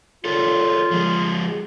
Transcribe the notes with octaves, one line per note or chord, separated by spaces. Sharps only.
F4 A4 A#4 C#5
F3 G#3